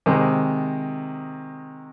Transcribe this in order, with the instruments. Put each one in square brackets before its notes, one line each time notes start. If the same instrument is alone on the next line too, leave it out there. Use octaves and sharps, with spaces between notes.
[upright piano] C3 D#3 G#3